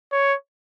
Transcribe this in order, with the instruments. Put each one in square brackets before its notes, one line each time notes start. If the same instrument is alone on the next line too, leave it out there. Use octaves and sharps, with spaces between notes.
[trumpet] C#5